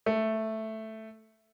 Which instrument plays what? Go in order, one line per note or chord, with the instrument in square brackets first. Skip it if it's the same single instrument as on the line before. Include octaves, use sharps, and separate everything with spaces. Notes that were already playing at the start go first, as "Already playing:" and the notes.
[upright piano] A3